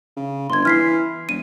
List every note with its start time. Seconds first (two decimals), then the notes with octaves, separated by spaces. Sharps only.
0.17 C#3
0.50 G1 C6 G#6
0.65 E3 F6 B6 C7
1.29 E1 D#7